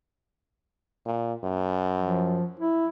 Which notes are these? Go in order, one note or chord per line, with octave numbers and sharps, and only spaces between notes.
A#2
F#2
F3
E4